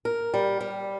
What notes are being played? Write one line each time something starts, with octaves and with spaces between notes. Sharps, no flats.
A#4
G3
G3